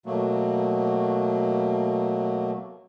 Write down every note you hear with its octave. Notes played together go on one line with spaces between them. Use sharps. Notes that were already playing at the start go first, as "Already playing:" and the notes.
B2 F#3 A3 A#3